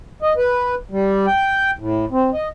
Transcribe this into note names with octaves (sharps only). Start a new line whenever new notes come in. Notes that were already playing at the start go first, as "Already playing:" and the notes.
D#5
B4
G3
G5
A2
C4
D#5